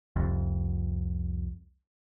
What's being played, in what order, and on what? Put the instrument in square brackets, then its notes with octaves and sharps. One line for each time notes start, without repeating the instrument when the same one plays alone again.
[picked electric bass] F1 C2 F2